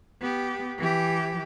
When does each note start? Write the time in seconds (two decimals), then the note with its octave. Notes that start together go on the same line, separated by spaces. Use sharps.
0.21 B3 G4
0.78 E3 G4